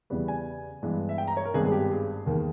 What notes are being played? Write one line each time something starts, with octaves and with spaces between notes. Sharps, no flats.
E2 C#3 E3 G3 B3
G#5
G2 E3 G#3 B3
E5
G5
A#5
C#5
A#4
G#1 G2 D#3 G#3 B3 G#4
G#4
G4
G#4
E1 D#2 D#3 A#3